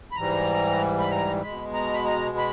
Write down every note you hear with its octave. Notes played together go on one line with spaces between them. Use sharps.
B5
G#2 E3 G3 A#5
B5
A#5
B2 G#3 B5
A#5
B5
A#5
B5